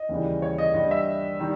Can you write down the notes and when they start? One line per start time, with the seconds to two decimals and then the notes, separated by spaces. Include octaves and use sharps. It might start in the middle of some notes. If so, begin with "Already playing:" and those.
Already playing: D#5
0.09 D#2 C#3 E3 G3
0.42 C#5
0.58 D#5
0.74 G2 G3 D#5
0.91 E5
1.40 D#3 G3